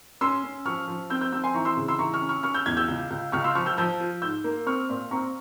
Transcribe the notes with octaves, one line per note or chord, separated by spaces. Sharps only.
C#4 C6 E6
C#4
F3 C#6 F6
F3
C4 E6 G6
E6 G6
C4 E6 G6
G#5 C6
E3 A#5 C#6
C6 E6
C#3
C6 E6
E3 A#5 C#6
C#6 F6
C#4
C#6 F6
C#4 C#6 F6
E6 G6
E2 F6 G#6
E6 G6
C#2
C#2
C#2 C#6 F6
C6 E6
F3 C#6 F6
E6 G6
F3 E6 G6
F4
G#2 E6 G6
A#3
C4 C#6 F6
A#2
C4 A#5 C#6